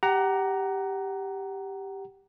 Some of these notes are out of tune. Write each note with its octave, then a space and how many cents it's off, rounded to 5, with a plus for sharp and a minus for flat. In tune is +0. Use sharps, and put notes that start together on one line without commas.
G4 +0 F#5 +25 A#5 +0